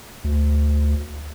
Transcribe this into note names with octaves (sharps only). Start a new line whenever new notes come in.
D2